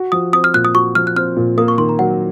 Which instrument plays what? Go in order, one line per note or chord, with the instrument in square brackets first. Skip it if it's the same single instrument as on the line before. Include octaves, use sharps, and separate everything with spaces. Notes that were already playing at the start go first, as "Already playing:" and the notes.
Already playing: [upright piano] F#4
[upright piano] F3 [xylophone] D#6
[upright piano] C4 [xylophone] D#6
[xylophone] F6
[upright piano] A#2 [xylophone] F#6
[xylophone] D#6
[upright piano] F#4 [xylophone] C#6
[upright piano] F3 [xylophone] F6
[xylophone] F#6
[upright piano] C4 [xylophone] F6
[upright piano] A#2
[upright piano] A#3 [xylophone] D#6
[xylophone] C#6
[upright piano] D#3 [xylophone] C6
[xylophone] A#5
[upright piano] F#3 [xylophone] F#5